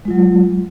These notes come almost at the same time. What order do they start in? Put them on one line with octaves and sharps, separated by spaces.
G#3 F4 F#3